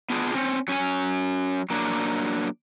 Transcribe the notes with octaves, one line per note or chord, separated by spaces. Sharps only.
B3 D4 F4 G#4
C4 C#4
F#3 C#4 D4 G#5
F#3 A#3 D4